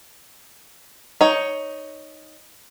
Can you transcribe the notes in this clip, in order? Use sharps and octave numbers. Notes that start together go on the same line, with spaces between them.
D#4 C#5